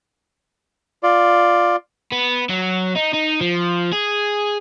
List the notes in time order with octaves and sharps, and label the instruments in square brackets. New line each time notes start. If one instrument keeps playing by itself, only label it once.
[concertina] F4 D5
[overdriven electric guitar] B3
F#3
D#4
D#4
F3
G#4